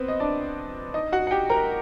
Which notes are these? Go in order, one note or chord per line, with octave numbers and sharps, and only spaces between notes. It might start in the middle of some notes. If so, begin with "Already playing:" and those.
Already playing: B3 C4 B4 C5
D#5
D4 D5
D#4 D#5
F#4 F#5
F#5
G4 G5
A#4 A#5